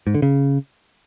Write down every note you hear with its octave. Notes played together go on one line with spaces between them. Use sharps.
G#2
D3
C#3